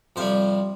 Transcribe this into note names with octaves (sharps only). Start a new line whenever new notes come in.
F2 C3 G3 C5